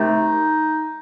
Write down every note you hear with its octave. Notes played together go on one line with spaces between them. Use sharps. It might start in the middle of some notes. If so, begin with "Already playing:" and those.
Already playing: C3 D#3 A3 D#4